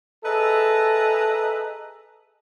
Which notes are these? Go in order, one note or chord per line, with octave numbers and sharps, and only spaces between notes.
G#4 A4 B4 D#5 E5 A#5